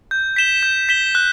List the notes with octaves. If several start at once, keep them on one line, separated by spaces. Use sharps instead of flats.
G6
B6 E7 G7
G6
B6 E7 G7
F#6